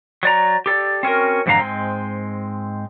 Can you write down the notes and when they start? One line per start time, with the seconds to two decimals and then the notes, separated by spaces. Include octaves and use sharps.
0.23 F#3 D5 A#5
0.66 G4 A4 D5
1.03 C4 C#4 F#4 A#4
1.46 F2 G#2 D3 E3 F5 A#5
1.59 G#2 G#3 C4